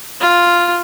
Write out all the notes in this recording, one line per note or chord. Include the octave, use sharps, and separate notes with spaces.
F4